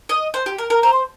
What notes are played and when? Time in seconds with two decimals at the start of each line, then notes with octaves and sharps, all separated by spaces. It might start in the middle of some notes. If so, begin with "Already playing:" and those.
0.09 D#5
0.34 C5
0.46 G4
0.58 A#4
0.70 A#4
0.83 C5 A#5
0.93 C6